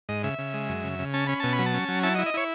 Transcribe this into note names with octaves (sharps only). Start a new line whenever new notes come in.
G#2 D#5
C#3 E5
C#3
G#3
F#2
C#3
C#3
C#4 A5
C#4 B5
B2 A5
B5
F#3
A5
C#4
F#3
E4 A5
D#5
E4
D#5
E4 C#5